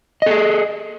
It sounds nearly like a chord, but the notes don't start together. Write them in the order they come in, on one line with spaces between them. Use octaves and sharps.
D#5 A4 G#4